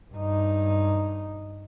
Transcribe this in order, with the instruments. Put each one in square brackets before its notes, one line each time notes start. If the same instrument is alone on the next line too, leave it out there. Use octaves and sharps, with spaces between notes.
[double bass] G2 D#4